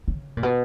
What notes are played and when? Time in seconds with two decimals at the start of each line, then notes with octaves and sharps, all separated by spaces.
0.08 C#3
0.37 A#2
0.43 B2